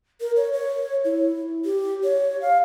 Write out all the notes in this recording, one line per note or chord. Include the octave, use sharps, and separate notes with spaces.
A#4
C#5
C#5
E4
G4
C#5
F5